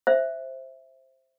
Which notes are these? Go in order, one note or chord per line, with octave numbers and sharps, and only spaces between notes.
C5 E5